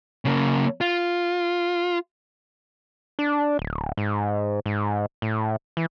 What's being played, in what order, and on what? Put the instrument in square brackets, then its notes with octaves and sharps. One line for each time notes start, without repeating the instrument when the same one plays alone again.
[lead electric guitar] C#3 A#3
F4
[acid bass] D4
D1
G#2
G#2
A2
E3